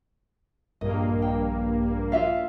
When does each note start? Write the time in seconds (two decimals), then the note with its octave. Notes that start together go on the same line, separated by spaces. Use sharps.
0.81 A#1 G2 A#3 D#5
1.22 G5
2.12 F4 E5 F5